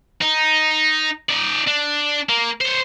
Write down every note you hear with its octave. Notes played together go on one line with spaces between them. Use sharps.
D#4
D#4 D5
D4
A#3
C5 C#5